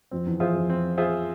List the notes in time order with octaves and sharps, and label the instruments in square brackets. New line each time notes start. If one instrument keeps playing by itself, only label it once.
[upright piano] F2 [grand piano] C4
[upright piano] E2
[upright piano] F2 [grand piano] F4 G#4 C5 E5
[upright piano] F2
[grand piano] C4
F4 G#4 C5 E5